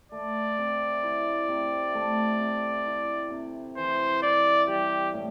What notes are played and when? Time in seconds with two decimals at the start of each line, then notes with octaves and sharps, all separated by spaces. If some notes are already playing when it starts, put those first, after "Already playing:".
0.12 A3 D5
0.58 C3
1.03 E4
1.49 C3
1.95 A3
2.40 C3
2.86 E4
3.31 C3
3.77 E3 C5
4.22 E4 D5
4.68 G3 G4
5.14 A2